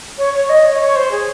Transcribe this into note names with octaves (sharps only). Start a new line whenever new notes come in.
C#5
C#5
D#5
C#5
C#5
C5
G#4